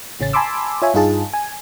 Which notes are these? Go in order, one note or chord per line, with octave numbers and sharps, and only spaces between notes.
A1 C#3 C#4 A6
G#5 A5 B5 C6 D6 E6
F4 C#5 E5 G#5
G2 D#4 F4 G#4 A5
G#5